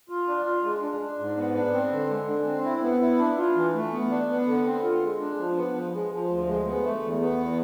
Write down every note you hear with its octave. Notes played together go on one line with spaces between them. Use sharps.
F4
D4
F4
G#3
D4
D4
G#2
B3
D4
C4
D3
G#3
D4
C4
E4
B3
E4
D4
F4
E3
A3
B3
D4
B3
D3
C4
F4
G#3
D4
F3
B3
F3
G#3
F3
D2
G#3
B3
A3
E2
B3
E2